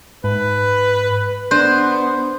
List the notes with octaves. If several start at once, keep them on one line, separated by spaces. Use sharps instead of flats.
G#2 B4
B3 D4 C5 F#6